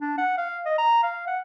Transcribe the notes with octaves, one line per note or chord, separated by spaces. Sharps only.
D4
F#5
F5
D#5
A#5
F5
F#5